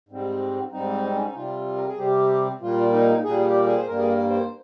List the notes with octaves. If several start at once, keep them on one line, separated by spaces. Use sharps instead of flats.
G#2 G3 C4
G#2 G3 C4 D#4
C4
C#4
D#4
C3 G3 C4 F4
A#4
G#4
C3 G3 C4 G4
A#2 G3 A#3 F4
D#4
A#2 G3 A#3 G#4
G#4
G4
G#4
C5
G2 G3 A#3 A#4
G#4
A#4
C5